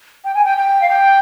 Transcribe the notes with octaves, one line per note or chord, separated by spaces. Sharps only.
G5
G#5
G5
G5
F5
G5